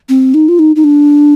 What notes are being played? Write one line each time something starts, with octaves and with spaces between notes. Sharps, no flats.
C4
D#4
F4
D#4
D#4
D4